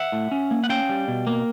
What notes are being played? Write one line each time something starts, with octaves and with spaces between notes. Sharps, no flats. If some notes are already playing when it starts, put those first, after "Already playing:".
Already playing: E5 F#5
A2
C#4
A#3
F#5
C#4 F5 G5
G3
B2
A#3